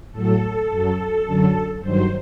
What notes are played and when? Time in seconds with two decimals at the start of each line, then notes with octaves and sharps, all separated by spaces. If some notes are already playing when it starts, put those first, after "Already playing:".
0.12 A2 F#3 A4
0.68 F#2 F#3
1.25 F#2 D3 F#3
1.81 G2 D#3 F#3 C5